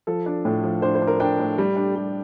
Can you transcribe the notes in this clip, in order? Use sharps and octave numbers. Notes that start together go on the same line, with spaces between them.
F3 A4
D4
A2
F3
D4 C5
C5
D4
A#4
D4 G5
A2
G3
D4
G3